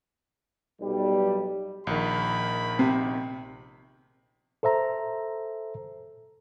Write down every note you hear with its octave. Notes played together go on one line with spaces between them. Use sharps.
B1 G3
A#1 D#3 B5
C3
A4 C5 E5 A#5